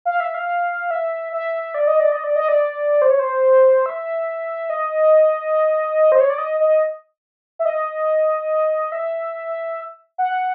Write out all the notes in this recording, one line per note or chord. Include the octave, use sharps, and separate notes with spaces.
F5
E5
F5
E5
E5
D5
D#5
D5
D#5
D5
D#5
D5
C5
C#5
C5
E5
D#5
C5
C#5
D5
D#5
D#5
E5
D#5
E5
F#5